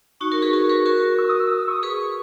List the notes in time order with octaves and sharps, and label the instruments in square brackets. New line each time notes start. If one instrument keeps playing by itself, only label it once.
[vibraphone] D#4 F#4 [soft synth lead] C#6
[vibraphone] F#4 A#4
G#4 B4
F#4 A#4
G#4 B4
F#4 A#4
[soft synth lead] E6
D#6
E6
D#6
E6
C#6
D#6
[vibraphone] G#4 B4 [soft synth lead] C#6